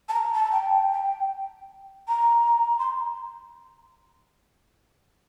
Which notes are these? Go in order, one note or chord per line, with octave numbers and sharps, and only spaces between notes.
A5
A#5
A5
G5
G5
A#5
C6